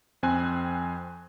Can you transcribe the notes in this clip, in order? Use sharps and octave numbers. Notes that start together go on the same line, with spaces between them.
F2 C4 G#5 F#6